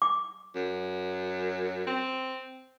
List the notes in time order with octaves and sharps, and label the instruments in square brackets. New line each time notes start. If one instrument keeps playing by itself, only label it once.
[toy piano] D6
[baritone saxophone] F#2
C4